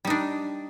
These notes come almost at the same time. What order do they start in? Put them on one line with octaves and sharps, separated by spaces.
G3 D#4 D4